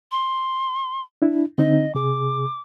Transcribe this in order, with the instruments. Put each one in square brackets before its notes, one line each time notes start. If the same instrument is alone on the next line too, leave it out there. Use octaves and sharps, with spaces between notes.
[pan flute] C6
[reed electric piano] D4 E4
[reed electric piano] D3 C4 D#4 [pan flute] D#5
[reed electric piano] C3 G#4 [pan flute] D6